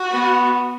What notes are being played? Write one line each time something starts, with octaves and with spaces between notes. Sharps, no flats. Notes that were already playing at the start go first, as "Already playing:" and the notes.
Already playing: F#4
B3